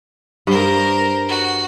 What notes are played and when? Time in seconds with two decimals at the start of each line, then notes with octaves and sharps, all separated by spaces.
0.47 G2 A#4 C5
1.28 F#4